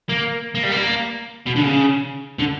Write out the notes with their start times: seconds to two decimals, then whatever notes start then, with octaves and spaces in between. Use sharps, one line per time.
0.09 A#3
0.55 A#3
0.63 G3
0.72 A#3
1.47 B2
1.56 D3
1.63 C#3
2.39 D3